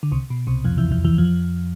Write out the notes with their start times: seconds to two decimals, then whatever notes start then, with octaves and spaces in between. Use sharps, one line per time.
0.03 D3
0.12 C2 C3
0.30 B2
0.47 C2 C3
0.65 F2 F3
0.78 E2 E3
0.91 E2 E3
1.05 E2 E3
1.18 F2 F3